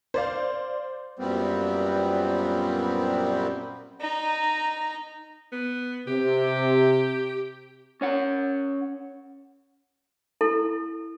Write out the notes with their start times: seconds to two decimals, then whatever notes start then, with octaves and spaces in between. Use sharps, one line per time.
0.14 C5 D5 F5
1.19 F#2 A#2 G3 B3 C4
4.01 D#4 A#5
5.52 B3
6.07 C3 G4
8.01 C#4 C#5 F#5
10.41 E4 A4